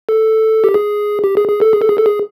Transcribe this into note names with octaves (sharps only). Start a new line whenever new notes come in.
A4
G4
G#4
G4
G#4
G#4
A4
G#4
A4
G#4
A4
G#4